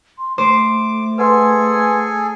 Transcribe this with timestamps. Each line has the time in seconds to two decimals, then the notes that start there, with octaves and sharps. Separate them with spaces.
0.18 C6
0.38 A3 C5 D6
1.18 G#4 A4 B4 F#5 G#5 C6